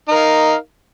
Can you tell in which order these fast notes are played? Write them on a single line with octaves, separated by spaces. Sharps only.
D#4 A#4 F5